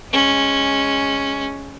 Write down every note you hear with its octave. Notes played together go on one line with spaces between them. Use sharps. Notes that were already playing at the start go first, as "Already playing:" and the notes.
G#3 C#4